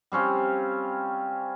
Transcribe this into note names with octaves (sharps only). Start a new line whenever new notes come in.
G3 C4 C#4 F4